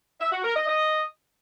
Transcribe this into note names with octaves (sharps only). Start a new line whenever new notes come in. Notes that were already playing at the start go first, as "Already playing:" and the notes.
E5
F#4
A#4
D#5
D#5